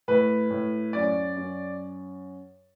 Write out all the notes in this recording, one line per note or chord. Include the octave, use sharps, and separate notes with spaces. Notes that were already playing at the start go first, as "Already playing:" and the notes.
A2 B4
A2
F#2 D5
F#2